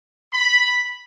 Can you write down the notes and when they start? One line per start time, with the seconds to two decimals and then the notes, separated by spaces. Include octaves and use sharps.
0.33 B5